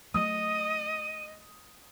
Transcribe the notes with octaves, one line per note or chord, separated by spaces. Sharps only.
F#3 A3 D#5 D#6 D#7